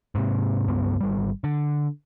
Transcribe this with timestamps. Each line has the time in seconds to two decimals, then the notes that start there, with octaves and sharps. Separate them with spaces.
0.15 G#2 C3
0.68 C#2 G2 G3 B3
1.01 G#1 G3
1.44 D3